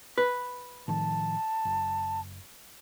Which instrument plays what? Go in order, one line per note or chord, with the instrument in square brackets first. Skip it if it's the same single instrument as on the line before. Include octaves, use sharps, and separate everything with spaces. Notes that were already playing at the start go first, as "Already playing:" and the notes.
[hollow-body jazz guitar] B4
[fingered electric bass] A2 D#3 F3 [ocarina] A5
[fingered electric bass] F#1